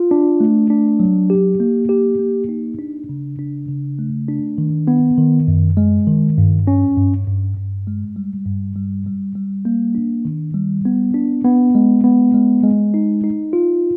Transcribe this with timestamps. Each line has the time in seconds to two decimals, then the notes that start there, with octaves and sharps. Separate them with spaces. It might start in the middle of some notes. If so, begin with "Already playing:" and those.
Already playing: F4
0.11 D4
0.40 A3
0.70 D4
1.00 F#3
1.30 G4
1.60 A#3
1.89 G4
2.19 A#3
2.49 D#4
2.79 D4
3.09 C#3
3.39 D4
3.68 C#3
3.99 A3
4.28 D4
4.58 D#3
4.88 B3
5.18 D#3
5.48 F#2
5.77 G#3
6.07 D#3
6.38 G2
6.67 C#4
6.97 G2
7.27 G2
7.57 G2
7.87 G#3
8.16 G3
8.46 G2
8.76 G3
9.06 G3
9.35 G3
9.65 A#3
9.95 D4
10.25 D#3
10.54 G3
10.85 B3
11.14 D4
11.45 B3
11.75 G#3
12.04 B3
12.34 G#3
12.63 G#3
12.94 D#4
13.24 D#4
13.53 F4